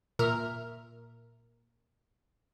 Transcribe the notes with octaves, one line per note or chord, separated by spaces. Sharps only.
A#2 A#4 E5 F6